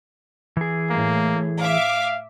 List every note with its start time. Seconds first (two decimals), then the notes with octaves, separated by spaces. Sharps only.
0.57 E3 G#4
0.90 A2 A#3
1.61 E5 F5 D6